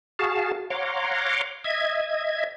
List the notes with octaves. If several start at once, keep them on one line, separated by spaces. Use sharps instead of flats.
F#4 G#4 F5 A5
C#5 F5 F#5 A#5 C6 D6
D#5 E5 G#6